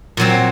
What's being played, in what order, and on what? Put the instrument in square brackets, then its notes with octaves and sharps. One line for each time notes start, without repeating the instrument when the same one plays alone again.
[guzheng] A#2 F#3 C4